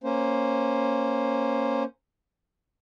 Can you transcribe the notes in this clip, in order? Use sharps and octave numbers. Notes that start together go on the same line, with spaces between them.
A#3 C#4 C5